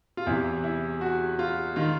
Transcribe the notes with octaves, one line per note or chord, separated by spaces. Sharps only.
F4
E2 C3 E3 E4
E4
F#4
F4
D#3 F4